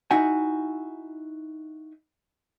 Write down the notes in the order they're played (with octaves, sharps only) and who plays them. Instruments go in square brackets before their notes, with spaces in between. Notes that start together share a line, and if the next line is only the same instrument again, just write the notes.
[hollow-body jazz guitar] D#4 E4 F#4 F#5 G#5